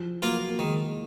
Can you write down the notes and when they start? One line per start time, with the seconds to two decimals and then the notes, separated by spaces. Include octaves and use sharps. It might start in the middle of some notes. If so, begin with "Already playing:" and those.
Already playing: F3
0.22 F#3 A#3 F4 A#4
0.49 A#3
0.59 D#3 G#3